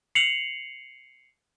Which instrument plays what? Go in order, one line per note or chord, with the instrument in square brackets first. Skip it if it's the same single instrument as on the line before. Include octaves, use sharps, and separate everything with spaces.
[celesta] C7 C#7 F7 F#7